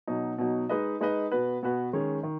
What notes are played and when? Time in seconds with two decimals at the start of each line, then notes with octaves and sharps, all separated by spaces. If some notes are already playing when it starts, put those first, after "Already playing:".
0.07 B2 F#3 D#4
0.38 B2 F#3 D#4
0.69 G#3 D#4 B4 D#5
1.01 G#3 D#4 B4 D#5
1.32 B2 B3 F#4 B4
1.63 B2 B3 F#4 B4
1.93 D#3 G#3 C#4
2.24 D#3